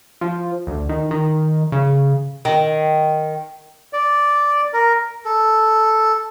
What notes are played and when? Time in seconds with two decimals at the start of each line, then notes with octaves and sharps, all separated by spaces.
0.21 F3
0.67 D2
0.89 D#3
1.11 D#3
1.72 C#3
2.45 D#3
3.93 D5
4.73 A#4
5.25 A4